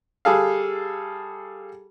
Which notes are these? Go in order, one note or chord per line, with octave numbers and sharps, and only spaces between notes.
G3 G#4 A4 F5